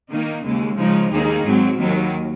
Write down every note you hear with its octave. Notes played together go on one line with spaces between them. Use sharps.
D#3 A#3 D#4
D#2 C#3 G#3
C#3 F3 G#3 D#4
D#2 D#3 A#3 D#4 G#4
G#2 F#3 C4
D#2 D#3 F#3